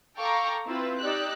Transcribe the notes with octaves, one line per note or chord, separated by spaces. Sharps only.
A4 F5 G5 A#5 C#6 D6
C4 E4 F4 B4
D#4 G4 D5 E6 F#6